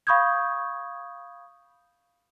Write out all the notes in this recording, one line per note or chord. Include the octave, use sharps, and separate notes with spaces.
F5 B5 C#6 D#6 G6 G#6